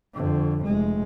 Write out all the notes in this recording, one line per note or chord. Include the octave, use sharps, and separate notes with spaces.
F2 D3
F1 G#3